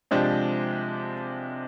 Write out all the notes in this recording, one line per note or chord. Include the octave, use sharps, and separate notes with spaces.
C3 F3 G#3 D4 G4